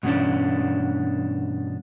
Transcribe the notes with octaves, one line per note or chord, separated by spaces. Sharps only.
G2 B2 E3 G3 C#4 D4